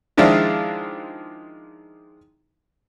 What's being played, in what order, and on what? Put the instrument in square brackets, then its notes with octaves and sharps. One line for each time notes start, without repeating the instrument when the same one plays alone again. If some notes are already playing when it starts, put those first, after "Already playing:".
[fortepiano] D#3 F3 G#3 D4 E4 F4